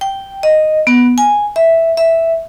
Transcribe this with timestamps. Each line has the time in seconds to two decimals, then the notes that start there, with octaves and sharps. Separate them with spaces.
0.01 G5
0.43 D#5
0.87 B3
1.18 G#5
1.56 E5
1.97 E5